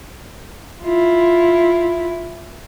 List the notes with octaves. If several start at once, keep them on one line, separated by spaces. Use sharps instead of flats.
E4 F4